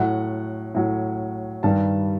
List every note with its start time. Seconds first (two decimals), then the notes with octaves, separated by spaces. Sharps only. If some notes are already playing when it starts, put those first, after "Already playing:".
Already playing: A2 F#3 F#5
0.75 A2 F#3
1.63 G2 D#3 G3 A5